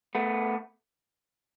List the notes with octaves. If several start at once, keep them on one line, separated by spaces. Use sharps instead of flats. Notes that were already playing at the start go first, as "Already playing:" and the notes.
A3 B3